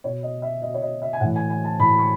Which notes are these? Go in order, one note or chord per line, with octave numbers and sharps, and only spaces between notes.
B2 C#5
D#5
E5
B2 D#5
C#5
D#5
E5
G#5
A2 E3 F#5
G#5
G#5
A5
A2 E3 B5
C#6